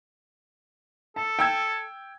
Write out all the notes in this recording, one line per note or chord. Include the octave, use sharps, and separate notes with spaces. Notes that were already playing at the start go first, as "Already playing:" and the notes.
A4 A5
G5 E6 G#6